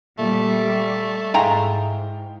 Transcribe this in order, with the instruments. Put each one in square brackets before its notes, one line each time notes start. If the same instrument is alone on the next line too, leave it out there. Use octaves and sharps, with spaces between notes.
[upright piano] A#2 [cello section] G3 [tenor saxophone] A3
[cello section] G#2 [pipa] G#3 E4 A#5 [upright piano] F5 G5